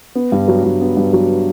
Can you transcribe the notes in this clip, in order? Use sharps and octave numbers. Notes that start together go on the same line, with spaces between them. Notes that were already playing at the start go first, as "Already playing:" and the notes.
B3
G2
F#3
G2
B3
G2
F#3